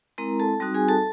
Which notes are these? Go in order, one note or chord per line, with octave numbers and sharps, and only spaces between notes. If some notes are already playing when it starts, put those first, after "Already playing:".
G#3 C4 E4 A#4 A#5
A4 A5
G3 C4 D#4 F#4
G#4 G#5
A4 A5